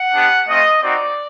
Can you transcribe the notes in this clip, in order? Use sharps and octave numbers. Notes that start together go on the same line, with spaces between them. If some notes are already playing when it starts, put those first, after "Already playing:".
Already playing: F#5
B3 D4 G4
A3 C4 F4 D#5
C4 D#4 F#4 D5